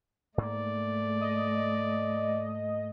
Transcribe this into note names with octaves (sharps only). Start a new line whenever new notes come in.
G#2 A3 A#3 D5
D#5